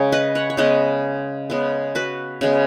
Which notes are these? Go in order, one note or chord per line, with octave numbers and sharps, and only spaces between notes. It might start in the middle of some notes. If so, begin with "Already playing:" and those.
Already playing: C#3 G#3 C#5
B4 D#5
C#5 F#5
C#5
C#3 G#3 B3 B4 D#5
C#3 G#3 B3
F#4 B4
C#3 G#3 B3